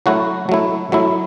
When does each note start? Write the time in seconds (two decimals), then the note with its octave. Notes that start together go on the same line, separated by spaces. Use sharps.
0.06 F#3 A3 E4 F#4
0.49 F#3 A3 E4
0.92 F#3 A3 E4